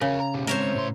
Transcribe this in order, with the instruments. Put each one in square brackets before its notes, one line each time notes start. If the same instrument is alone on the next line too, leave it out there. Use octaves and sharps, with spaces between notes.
[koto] C#3 [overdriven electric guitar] A#4 C#5
[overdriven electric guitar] A#5
B2 G3
[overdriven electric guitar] G#3 C4 [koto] A#4 [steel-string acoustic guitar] C5 C#5 E5
[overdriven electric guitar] A2 C6